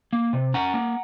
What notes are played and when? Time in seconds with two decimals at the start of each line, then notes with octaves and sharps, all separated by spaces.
0.13 A#3
0.33 C3
0.54 C#4 F#5 A#5
0.74 A#3